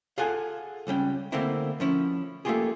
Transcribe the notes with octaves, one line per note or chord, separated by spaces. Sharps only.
F4 G#4 A4 F#5 G#5
C#2 G3 C#4 G5
D3 A3 A#3 C4 E4
F3 C#4 E4
A3 A#3 C4 F4 G4 G#4